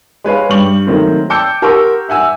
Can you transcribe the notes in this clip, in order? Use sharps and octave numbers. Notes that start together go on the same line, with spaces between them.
G#3 B4 C#5 F5
G2 G3 G4 C#6 F#7
D#3 F#3 A3 A#3 C4
G5 A5 D6 E6 G6 C#7
G4 A#4 F#5 C6 C#6 E6
E5 F#5 G#5 E6